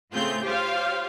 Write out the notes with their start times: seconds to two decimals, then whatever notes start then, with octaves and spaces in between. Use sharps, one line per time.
0.13 A2 C#3 A3 C4 F4 G6
0.43 F4 G4 C5 C#5 F5